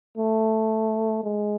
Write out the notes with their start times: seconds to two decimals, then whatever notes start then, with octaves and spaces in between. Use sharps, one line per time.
0.18 A3
1.24 G#3